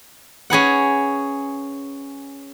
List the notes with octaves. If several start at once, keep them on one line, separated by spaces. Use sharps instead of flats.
C#4 G#4 B4 F#5